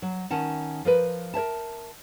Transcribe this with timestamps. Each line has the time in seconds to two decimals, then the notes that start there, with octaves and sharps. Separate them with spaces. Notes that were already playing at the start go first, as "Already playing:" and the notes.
0.02 F#3
0.31 D#3 C#4 F#5 A5
0.85 F3 A#4 B4
1.34 A#4 C#5 E5 A5